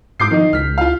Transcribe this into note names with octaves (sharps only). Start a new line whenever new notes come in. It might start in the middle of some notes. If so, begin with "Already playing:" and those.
G#2 D6 G6 C7
D#3 F3 D#4
C#2 F6 B6
F4 F5